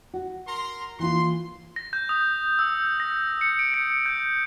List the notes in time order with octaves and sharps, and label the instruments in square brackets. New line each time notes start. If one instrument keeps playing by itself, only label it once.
[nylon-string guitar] F#4
[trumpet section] A#4 A#5 C6
[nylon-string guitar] E3 A#3 F4 [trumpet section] C6
[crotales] A#6
G6
D#6
E6
A#6
C#7
D7
C#7
G6